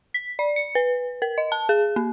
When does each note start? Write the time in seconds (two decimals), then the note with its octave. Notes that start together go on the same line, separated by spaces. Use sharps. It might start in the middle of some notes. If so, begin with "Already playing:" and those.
0.14 B6
0.39 D5
0.56 C#7
0.75 B4
1.22 A#4
1.38 D#5
1.52 A5
1.69 G#4
1.96 A#3